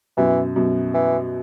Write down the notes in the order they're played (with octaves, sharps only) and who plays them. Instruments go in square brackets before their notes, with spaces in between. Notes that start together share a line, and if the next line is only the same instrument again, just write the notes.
[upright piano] F#2 B2 [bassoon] E3
[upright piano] F#2 B2
[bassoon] E3